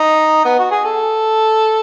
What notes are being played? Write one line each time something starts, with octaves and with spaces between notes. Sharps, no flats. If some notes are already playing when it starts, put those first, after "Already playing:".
Already playing: D#4
B3
F#4
G#4
A4